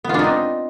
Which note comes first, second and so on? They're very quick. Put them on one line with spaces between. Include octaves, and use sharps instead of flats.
B3 F4 D4 D#4 C4